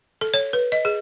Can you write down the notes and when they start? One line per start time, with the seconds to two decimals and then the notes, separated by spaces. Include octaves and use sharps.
0.21 A4
0.34 C#5
0.53 B4
0.72 D#5
0.85 G#4